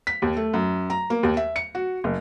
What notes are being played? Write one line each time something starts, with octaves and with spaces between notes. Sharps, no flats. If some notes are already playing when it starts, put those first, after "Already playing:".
B6
D#2
A3
F#2
A#5
A#3
D#2
E5
C#7
F#4
F#1